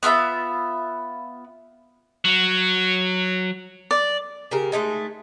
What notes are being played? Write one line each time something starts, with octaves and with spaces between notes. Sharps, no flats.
B3 F4 E5 B5
F#3
D5
C#3 G4 A#4
G#3 A3 C#4 D#4